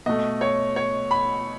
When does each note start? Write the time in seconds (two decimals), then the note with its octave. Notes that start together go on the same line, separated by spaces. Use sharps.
0.06 B2 A3 D#5
0.41 C#5
0.76 C#5
1.11 B5